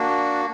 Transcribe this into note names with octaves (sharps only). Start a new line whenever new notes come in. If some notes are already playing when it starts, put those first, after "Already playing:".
Already playing: A#3 D4 F#4